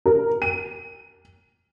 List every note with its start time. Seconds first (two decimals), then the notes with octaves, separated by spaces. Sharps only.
0.06 A#4
0.42 D#7